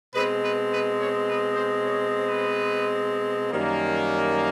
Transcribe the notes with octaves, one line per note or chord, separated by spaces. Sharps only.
B2 G#3 C4 B4
B4
B4
C#5
B4
C5
C#5
B4
F#2 D#3 G3 A#3